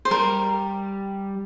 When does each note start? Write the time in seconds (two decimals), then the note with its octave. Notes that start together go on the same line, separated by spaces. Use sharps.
0.05 C5
0.11 G3 A#4